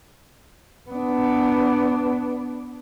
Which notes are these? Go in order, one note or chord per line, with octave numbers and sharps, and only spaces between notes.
B3 D4